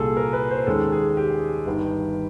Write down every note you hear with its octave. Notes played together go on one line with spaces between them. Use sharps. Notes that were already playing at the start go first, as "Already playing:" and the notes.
Already playing: C2 A#2 G3 G#4 A4
A#4
B4
C5
D#2 D#3 G#3 C#4 A4
G#4
G4
G1 G2 D#3